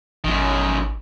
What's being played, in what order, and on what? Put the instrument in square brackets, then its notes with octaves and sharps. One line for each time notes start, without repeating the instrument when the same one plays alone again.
[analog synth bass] G#1 [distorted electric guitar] F#2 D#3